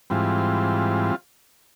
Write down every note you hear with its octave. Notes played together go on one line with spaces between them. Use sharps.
G#2 E3 G3 C4 F4